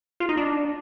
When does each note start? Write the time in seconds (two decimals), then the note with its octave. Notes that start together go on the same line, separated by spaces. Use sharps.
0.20 F4
0.29 D#4
0.37 D4